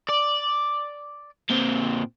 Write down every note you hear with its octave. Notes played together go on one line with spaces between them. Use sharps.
D5
A#2 C4